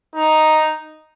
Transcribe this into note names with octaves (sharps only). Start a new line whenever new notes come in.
D#4